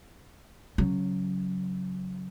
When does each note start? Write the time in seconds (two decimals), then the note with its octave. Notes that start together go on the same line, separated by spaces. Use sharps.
0.78 C#3 F#3